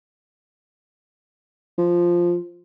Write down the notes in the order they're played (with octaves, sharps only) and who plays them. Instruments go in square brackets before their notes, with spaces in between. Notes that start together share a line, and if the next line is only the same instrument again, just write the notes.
[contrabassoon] F3